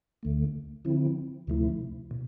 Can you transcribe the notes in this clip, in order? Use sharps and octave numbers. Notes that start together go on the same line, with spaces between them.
D2 D3 A3
D3 F3 C4 E4
D2 C3 F3 A3 E4
B2